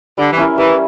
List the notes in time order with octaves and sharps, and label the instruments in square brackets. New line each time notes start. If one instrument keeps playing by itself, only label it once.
[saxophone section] D3 [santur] G3
[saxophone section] E3
[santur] C#4 E4 A#4
[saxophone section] E3 [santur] G3